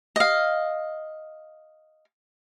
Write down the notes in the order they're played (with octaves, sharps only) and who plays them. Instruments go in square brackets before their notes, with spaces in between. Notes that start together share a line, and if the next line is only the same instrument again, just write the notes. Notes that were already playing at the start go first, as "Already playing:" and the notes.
[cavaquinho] D#5 F5